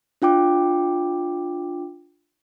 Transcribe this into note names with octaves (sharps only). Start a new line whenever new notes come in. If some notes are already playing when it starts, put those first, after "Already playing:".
D4 F4 G5 D6